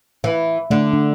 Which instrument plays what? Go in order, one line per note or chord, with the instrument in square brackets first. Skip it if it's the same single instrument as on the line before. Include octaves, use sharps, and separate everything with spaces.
[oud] E3
[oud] D3 [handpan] A3
[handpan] D4